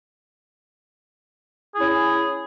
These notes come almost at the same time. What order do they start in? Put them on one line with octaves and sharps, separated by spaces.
G#4 E4 C#4